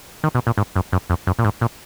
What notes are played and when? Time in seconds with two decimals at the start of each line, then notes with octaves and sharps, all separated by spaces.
0.24 D#3
0.35 B2
0.47 A#2
0.58 G#2
0.76 F#2
0.92 F#2
1.10 F2
1.27 F#2
1.39 A#2
1.45 G#2
1.61 A#2